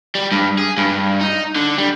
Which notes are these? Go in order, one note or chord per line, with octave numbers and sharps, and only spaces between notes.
G3
G2
G#4
G2
D#4
D3
G3